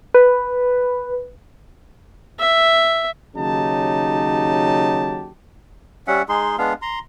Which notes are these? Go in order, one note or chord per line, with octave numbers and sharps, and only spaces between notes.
B4
E5
D#2 C#3 F#3 D#4 G4 A5
G3 C#4 E5 F#5
G#3 D#4 G#4 C6
G#3 B3 D4 F5
A#5 C6